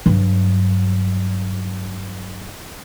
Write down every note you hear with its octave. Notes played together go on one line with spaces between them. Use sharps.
G2 F#3